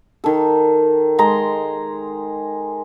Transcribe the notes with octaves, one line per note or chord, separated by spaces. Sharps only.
D#3 A4
G#3 A#5 C6